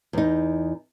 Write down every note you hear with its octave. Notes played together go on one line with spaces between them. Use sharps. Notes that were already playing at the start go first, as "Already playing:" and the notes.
E2 D#4